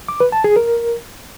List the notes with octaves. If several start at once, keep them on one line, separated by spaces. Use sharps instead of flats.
D6
B4
A5
G#4
A#4